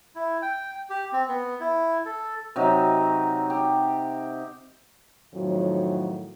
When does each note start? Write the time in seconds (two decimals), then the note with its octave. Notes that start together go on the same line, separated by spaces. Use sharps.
0.15 E4
0.42 G5
0.90 G4
1.13 C4
1.29 B3
1.60 E4
2.06 A4
2.56 C3 F#3 D#4
3.50 G4
5.33 F2 A2 D#3 F#3